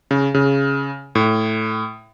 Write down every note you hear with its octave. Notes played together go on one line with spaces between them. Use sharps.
C#3
C#3
A2